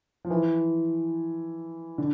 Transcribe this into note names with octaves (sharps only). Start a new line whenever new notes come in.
F3
E3
D3